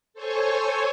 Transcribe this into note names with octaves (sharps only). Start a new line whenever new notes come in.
A4 C5 C#5 G#5 C#6